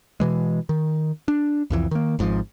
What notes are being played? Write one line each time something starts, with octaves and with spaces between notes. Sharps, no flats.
B2 E3 G#3
D#3
D4
C2 F2 E3
D#3 A#3
G#1 G#2 D#3 F3